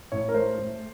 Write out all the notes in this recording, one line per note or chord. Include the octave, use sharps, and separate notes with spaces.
A2 C#5
A#4
A3 C5
A3